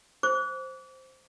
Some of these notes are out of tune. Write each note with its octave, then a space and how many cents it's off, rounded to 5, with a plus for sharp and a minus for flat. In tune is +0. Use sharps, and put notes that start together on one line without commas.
C5 +0 D6 -40